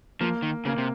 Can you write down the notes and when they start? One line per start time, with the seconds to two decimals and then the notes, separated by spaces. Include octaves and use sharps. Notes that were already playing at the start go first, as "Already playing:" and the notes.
0.21 F3 A#3
0.43 D#3
0.65 C#3 A#3
0.78 C3